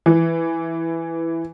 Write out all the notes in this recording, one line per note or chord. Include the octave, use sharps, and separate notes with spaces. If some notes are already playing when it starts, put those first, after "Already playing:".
E3